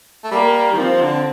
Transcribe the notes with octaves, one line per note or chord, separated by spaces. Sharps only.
A3
G3 A#3
D#3
F3 C4
D3